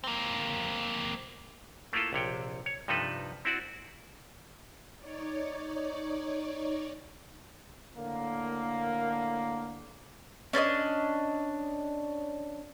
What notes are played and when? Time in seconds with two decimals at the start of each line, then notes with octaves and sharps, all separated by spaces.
0.04 A#3 C4
1.93 A3 A#3 E4 F4 A4
2.13 A#1 C3 C#5 G5
2.66 C#5
2.88 G2 C3 F3 D#4 A4 B4
3.45 C4 E4 F#4 D5
4.98 D#4 C#5 D5
7.96 A2 D3 A#3
10.53 C#4 D4 C5 D#5